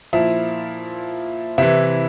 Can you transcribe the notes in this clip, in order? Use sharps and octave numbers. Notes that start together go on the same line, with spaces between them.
A#2 F3 E4
C3 E3 E4